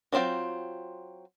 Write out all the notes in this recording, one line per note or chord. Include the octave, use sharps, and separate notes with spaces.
E3 F#3 C4 F4 G5